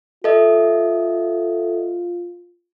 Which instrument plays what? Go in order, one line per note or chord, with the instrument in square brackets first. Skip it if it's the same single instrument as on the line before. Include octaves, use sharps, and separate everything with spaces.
[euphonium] F4 [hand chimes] A4 D#5 E5